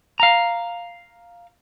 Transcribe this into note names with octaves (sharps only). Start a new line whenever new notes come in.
F5 A#5